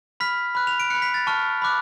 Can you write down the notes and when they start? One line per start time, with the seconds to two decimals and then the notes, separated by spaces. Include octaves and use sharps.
0.20 B5 F6 B6
0.55 B5 F#6
0.67 F7
0.80 D7
0.90 B5 F#6 C#7
1.02 B6
1.14 A6
1.27 A5 C#6 F6
1.62 B5 D6 F#6